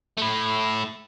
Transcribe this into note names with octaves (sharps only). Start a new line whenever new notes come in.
A3 E4